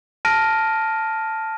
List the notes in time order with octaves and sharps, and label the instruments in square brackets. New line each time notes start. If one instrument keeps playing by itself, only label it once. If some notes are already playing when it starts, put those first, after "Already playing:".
[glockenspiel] A5 F6 A#6 D7 D#7